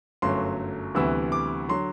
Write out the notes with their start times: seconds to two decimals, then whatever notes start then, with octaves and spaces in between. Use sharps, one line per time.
0.22 G1 F#2 F#3 A3 C6
0.95 D2 C3 E3 G3 B3 E6
1.32 D6
1.69 D3 F#3 C6